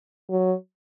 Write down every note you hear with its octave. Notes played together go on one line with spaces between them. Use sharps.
F#3